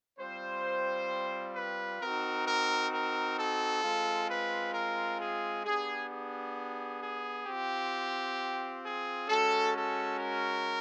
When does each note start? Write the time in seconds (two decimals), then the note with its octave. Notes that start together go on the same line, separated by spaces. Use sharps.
0.18 G3 C4 F4 C5
1.54 B4
2.00 C4 D#4 F#4 A#4
2.46 A#4
2.91 A#4
3.36 A4
3.83 G#3 C4 F4
4.27 B4
4.73 A#4
5.19 G#4
5.65 B3 D4 G4 G#4
6.09 G#4
7.00 G#4
7.46 C4 F4 G4
8.84 G#4
9.29 G#3 C#4 F#4 A4
9.75 A4
10.19 A#4